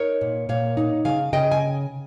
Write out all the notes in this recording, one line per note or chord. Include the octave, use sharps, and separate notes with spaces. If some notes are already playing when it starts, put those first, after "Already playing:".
Already playing: D#4 A#4 C#5
A#2
A#2 C#5 F5
D#4
C#3 F5 G#5
C#3 D#5 G5
G#5